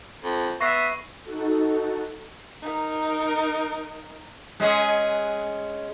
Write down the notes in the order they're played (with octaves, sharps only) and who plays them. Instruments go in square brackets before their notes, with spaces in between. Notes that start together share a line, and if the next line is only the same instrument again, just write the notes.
[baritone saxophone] F2
[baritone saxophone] B3 [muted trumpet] E5 [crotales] C#6 A#6 C7
[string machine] D#4 F#4 A4
[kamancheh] D#4 A#4
[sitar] G#3 C#4 G#4